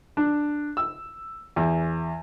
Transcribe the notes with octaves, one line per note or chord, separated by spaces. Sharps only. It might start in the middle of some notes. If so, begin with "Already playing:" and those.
D4
E6
E2